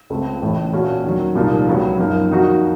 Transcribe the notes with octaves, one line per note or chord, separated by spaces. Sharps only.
C#2 C#3 A3 C4 F4
A1 A2 A3
A#2 A3 C#4 F#4
D#2 D#3 F#3
C2 A#2 F3 A#3 D#4
C#2 C#3 F#3
F#2 F3 A#3 D#4
F2 D#3 A#3 D#4 F#4